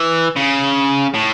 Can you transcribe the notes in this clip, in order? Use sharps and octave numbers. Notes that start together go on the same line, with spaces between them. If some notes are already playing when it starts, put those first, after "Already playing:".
Already playing: E3
C#3
A2